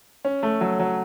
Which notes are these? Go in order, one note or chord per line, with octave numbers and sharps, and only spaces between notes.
C#4
A3
F#3
F#3